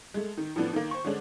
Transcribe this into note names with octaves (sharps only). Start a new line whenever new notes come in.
G#3 A3
D#3
A2 E3 F3 B3 D4
D#3 A#3
C5 C#6
D3 G#3 C#4 D4